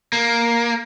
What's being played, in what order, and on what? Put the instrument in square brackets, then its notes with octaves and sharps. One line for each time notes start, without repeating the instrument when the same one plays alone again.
[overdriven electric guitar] A#3